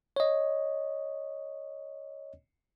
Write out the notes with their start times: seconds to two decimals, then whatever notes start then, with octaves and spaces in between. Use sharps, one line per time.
0.16 C#5 D#5